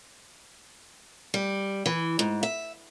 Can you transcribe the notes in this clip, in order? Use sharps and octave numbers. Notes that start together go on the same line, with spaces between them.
G3
E3
G#2
E5